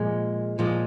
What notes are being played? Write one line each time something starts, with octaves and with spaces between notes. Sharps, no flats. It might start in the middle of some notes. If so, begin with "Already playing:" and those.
Already playing: A#2 F3 G#3
A#2 F3 G#3